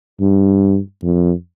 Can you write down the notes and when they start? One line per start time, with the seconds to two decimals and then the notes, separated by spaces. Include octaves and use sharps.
0.21 G2
1.03 F2